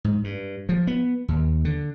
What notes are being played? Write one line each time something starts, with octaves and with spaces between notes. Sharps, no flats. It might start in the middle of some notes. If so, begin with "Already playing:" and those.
G#2
G2
F3
B3
D#2
D3